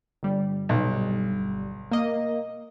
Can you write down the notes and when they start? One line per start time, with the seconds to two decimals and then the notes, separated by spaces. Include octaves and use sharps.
0.23 G1 G3
0.69 B1
1.91 A#3 D#5